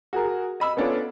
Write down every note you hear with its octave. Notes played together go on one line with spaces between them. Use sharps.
F#4 G#4 A#4
D#5 B5 E6
B3 C#4 D4 F4 A4 C#5